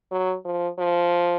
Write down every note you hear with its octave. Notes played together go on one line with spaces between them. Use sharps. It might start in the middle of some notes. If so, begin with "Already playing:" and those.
F#3
F3
F3